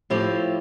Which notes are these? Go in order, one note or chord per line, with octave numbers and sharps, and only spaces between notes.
A2 F3 C4 E4 G4